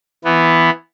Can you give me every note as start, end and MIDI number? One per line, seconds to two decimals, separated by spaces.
0.24 0.70 52
0.24 0.70 59